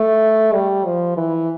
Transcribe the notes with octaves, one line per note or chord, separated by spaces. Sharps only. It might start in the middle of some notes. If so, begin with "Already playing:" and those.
Already playing: A3
G3
F3
E3